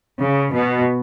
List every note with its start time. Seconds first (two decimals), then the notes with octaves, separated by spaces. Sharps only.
0.21 C#3
0.54 B2